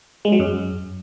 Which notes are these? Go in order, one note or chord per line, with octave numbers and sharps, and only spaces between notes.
G#3
F#3
F#2